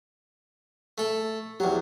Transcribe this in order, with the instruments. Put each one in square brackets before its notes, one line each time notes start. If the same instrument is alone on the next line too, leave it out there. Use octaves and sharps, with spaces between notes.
[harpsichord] A3 A4
[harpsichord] E2 F#3 [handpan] G4